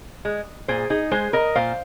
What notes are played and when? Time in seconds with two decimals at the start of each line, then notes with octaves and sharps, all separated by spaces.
0.25 G#3
0.68 A#2 G#4 C5
0.90 D#4 G#4
1.11 G#3 G#4 C5
1.33 A#4 D#5
1.55 A#2 C5 F5